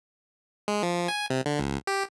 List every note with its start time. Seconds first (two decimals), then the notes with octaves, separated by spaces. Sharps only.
0.68 G#3
0.83 F3
1.08 G#5
1.30 C3
1.46 D3
1.59 C#2
1.87 G4